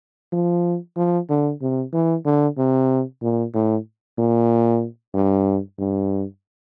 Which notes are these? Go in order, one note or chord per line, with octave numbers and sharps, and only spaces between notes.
F3
F3
D3
C3
E3
D3
C3
A#2
A2
A#2
G2
G2